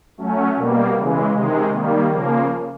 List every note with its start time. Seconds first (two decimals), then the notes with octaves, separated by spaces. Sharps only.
0.18 F#3 A3 C#4
0.56 B2 G3 A#3
0.95 C#3 E3 G#3
1.33 C3 D#3 G#3
1.72 D#3 G3 A#3
2.10 C#3 F3 A#3